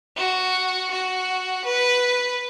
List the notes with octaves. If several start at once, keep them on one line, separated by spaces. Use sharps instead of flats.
F#4
F#4
B4